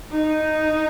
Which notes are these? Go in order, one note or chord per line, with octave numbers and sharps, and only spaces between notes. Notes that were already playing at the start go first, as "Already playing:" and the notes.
D#4